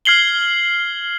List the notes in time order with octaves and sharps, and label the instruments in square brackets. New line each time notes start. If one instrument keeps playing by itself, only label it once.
[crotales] F6 G#6 C7 F#7 G7